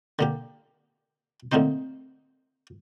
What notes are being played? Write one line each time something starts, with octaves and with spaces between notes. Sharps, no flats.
D3 A#3 G4
A2 D3 A#3 C4 D#4 C5